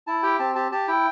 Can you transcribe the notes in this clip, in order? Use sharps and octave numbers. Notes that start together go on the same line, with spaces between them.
E4 A5
G4 G5
C4 A5
G4 A5
G4 A5
E4 G5